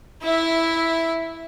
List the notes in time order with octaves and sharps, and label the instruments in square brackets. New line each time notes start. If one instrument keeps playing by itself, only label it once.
[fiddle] E4 E5